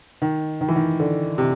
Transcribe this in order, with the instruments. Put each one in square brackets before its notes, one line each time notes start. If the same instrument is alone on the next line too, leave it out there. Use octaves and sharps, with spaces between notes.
[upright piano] D#3
D#3
E3
D#3
D3
C3